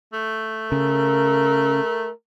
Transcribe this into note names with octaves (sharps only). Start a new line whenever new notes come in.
A3
C#3 A#4